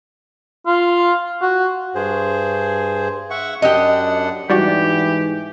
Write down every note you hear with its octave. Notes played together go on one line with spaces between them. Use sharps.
F4
F#4
G2 G#4 C5
E5 F#5 C#6
F#2 D4 G4 D#5 F#5
G#2 E3 G3 D4 F#4 G4